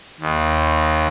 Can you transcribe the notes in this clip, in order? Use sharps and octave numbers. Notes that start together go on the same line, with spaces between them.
D#2